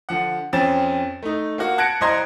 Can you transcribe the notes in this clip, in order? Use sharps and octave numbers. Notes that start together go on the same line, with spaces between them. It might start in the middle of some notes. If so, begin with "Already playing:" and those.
D3 F3 F#5
F2 C4 C#4 A6 E7
A3 D#4
A#3 F4 F#4
A5 F#6 G#6 A#6 C#7 D7
C2 C5 D#5 A#5 C6 G#6